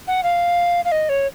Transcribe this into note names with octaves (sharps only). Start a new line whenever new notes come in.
F#5
F5
F5
D#5
C#5